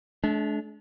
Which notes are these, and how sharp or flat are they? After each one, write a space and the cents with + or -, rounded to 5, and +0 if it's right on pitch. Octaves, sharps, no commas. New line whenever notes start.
A3 -45 D4 -15